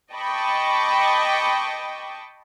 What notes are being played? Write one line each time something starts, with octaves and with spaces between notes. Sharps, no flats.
D#5 G5 A5 B5 C#6 D6